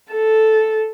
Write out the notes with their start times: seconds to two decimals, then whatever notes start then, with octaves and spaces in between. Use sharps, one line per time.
0.12 A4